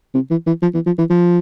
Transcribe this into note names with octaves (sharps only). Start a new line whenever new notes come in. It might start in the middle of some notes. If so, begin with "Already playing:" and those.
C3
E3
E3
F3
E3
F3
E3
F3